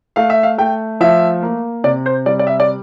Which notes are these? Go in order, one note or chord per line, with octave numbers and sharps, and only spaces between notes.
A3 F5
E5
F5
A3 G5
F3 E5
A#3
C3 D5
C5
G3 D5
D5
E5
D5